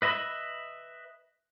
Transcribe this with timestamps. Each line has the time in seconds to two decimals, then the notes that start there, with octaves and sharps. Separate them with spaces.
0.02 B4 D#5 E5 B5